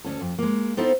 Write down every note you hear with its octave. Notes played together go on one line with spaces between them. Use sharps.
D2 C#4 A4
F2
G#3 A#3
B3 C4 D#4 E4 A4 C5